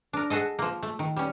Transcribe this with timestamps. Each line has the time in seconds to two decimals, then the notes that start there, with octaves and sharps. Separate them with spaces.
0.13 D4 A#4
0.30 F#4 G#4 A4 D#5
0.59 F3 A#3
0.83 A3
0.99 D#3
1.16 G3 C#4